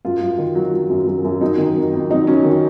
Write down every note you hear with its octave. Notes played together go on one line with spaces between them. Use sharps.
F#2 F4
F#2
D#3
F#3
F#3
F#2
F#2
F#2
F#3 D#4
D#3
F2
F2
F#3 D#4
F#3 C#4
D#3